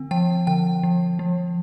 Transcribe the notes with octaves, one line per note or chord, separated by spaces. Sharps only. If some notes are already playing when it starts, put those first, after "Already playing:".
Already playing: D3 C4
F3 G5
D3 G5
F3
F3